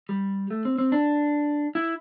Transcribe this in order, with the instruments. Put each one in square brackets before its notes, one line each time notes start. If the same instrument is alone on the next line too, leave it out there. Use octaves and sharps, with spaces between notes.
[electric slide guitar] G3
A3
C4
C4
D4
E4